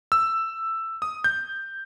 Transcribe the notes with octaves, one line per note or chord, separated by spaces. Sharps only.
E6
D#6
G6